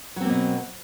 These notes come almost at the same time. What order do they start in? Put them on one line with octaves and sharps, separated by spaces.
F#3 C4 A#3 B2